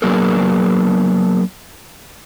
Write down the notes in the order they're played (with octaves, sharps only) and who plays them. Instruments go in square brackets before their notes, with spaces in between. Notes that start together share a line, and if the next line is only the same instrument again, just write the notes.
[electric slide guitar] F#3 A#3 B3 D4 G#4 A#4